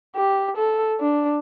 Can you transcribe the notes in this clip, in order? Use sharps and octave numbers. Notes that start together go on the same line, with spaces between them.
G4
A4
D4